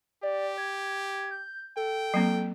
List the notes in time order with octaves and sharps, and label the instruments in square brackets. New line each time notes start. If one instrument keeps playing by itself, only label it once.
[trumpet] G4 [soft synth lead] D5
[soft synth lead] G#6
G6
[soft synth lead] A4 [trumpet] G5
[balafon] F#3 A#3 C4